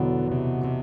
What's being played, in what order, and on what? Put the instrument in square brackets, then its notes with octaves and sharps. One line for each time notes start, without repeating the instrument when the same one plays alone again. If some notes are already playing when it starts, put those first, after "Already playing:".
Already playing: [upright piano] E2 B2 F#3 B3 [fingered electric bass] D3
[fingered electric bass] C3
C3